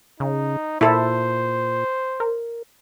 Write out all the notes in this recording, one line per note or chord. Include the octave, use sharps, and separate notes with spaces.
C#3 D#4
A#2 E4 A4 C5
A#4